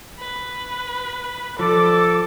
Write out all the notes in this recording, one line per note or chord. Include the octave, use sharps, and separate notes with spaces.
B4
F3 A4 D5 D6